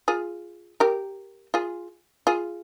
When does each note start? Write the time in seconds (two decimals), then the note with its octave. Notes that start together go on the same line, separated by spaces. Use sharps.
0.08 F4 G#4
0.80 G4 A#4
1.54 F4 G#4
2.27 F4 G#4